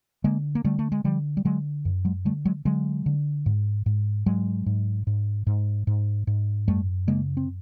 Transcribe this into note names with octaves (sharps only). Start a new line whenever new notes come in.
D3 G#3 A#3
A#3
D3 G3 A3
A3
G#3
D3 F3 G3
G3
D3 F#3 G#3
F#2
F#3 G#3
D3 G3 A3
F#3 G#3
D3 F#3 G#3
D3
G#2
G#2
G#2 F#3 G#3
G#2
G#2
G#2
G#2
G#2
F#2 G3 A3
C#3 G#3 A#3
C4